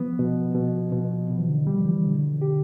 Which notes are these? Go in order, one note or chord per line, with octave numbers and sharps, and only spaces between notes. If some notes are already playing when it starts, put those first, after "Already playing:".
Already playing: F3 B3
B2
B2
B2
B2
E3
D3
F3 G3
E3
B2 D3
G4